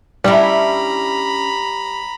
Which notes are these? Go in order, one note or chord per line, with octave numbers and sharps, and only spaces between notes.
G3 C#4 D4 E4 A#5 B5